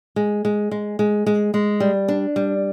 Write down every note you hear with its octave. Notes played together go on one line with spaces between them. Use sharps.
G#3
G#3
G#3
G#3
G#3
G#3
G3
D4
G3